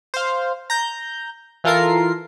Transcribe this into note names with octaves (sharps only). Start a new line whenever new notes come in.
C5 F5
A#5 G6
E3 F4 A4 A#4 C7